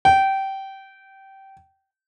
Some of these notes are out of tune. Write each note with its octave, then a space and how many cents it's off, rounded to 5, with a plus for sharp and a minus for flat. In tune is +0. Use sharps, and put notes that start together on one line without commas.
G5 -20